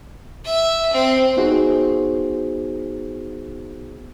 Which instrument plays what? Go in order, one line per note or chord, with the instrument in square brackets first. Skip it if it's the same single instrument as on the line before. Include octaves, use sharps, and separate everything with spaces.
[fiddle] E5
C4
[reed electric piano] B3 D#4 F#4 G#4 C5